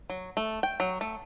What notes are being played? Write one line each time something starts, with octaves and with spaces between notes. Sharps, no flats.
F#3
A3
G5
F#3
A3